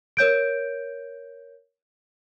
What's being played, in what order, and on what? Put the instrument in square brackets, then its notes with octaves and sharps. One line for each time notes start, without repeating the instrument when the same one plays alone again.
[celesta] A#4 C#5 G6 D7